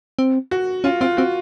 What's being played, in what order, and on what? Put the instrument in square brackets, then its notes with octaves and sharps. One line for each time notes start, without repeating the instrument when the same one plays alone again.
[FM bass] C4
[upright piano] F#4
[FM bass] C#4 [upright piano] F4
[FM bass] C4 [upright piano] F4
[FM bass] C4 [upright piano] F#4